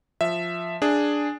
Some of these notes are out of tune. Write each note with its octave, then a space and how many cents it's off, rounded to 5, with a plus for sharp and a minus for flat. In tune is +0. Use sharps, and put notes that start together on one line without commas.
F3 +0 E5 +0
D4 +0 G#4 +0